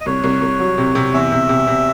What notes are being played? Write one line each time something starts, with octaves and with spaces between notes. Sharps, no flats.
D#5
C2 C#5
C2
C2
F#3
C3
C3
E2 E5
C3
C3
C3